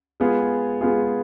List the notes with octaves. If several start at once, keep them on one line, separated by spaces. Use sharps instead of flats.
G#3 B3 F4 G#4
G#3 B3 F4 G#4